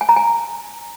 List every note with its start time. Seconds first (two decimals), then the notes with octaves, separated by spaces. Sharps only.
0.01 G#5
0.09 A#5
0.16 G#5